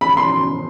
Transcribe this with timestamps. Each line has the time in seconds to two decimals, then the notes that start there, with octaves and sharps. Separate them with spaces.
0.01 B5
0.17 C6